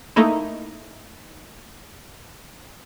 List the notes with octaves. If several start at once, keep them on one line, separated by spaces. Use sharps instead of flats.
A3 A#3 D#4 E4